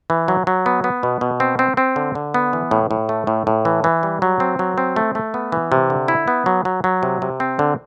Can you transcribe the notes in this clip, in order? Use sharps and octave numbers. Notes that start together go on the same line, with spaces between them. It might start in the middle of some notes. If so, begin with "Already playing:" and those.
E3
F#3
F#3
B3
B3
B2
B2
C4
C4
C4
D3
D3
B3
E3
A2
A2
A3
A2
A2
E3
E3
G3
F#3
C4
F#3
C4
A3
A3
B3
E3
C3
D3
E4
B3
F#3
F#3
F#3
C3
C3
C4
D3